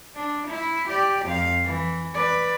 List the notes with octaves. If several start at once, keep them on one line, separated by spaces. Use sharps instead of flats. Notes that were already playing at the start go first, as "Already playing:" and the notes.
D4
E4
G4 D5
F2 F5
E3
B4 D5